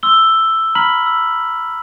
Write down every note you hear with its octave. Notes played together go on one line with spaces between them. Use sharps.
C6 E6 G7
A#5 B5 F6 B6 F#7
E6